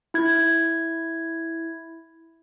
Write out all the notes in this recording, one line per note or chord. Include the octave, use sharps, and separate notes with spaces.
E4 G#6